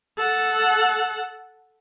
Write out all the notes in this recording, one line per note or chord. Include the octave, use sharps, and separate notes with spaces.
A4 F#5